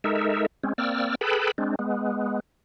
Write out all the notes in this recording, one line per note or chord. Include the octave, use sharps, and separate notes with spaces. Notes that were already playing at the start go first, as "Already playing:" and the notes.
G#3 D#4 A4 A#4 E5
G#3 C4 C#4
A#3 C4 D5 E6 F6
G#4 A4 B4 G5 A5 B5
G#3 C4 D4
G#3 B3